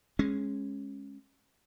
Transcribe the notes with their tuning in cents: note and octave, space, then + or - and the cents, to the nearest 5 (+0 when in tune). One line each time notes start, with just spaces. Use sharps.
G#3 +0 C#4 -15